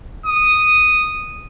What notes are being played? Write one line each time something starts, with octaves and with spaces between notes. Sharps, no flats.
D#6